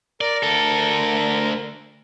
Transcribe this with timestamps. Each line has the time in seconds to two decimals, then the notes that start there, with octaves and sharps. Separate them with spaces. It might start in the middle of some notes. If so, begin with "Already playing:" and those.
0.21 A#4 D5
0.43 D2 A4